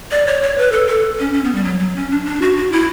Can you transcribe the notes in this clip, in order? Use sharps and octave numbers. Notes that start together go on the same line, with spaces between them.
D5
C#5
C#5
B4
A4
A4
C#4
C#4
B3
G3
F#3
F#3
C#4
D4
D4
F#4
F#4
E4